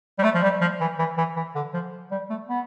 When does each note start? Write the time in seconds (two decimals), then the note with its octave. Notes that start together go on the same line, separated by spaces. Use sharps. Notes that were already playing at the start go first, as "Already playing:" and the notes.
0.19 G3
0.23 A3
0.34 F3
0.43 G3
0.61 F3
0.80 E3
0.99 E3
1.18 E3
1.36 E3
1.55 D3
1.74 F3
2.11 G3
2.30 A3
2.49 B3